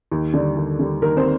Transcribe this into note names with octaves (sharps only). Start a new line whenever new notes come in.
D#2
D3 G3
D#2
D3 G3
D#2 A#4
C4 C5